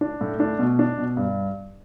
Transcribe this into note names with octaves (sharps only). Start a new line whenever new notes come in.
D4
A2
D4
B2
D4
B2
G2